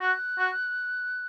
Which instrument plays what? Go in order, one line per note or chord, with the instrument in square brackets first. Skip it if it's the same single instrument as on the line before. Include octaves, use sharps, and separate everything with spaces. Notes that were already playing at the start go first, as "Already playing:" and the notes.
[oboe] F#4 [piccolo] F#6
[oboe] F#4